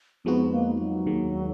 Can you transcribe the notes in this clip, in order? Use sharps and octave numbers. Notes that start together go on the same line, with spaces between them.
F2 F3 G#3 B3 D#4 F#4
A#3
F#3
D#2 D#3 G#3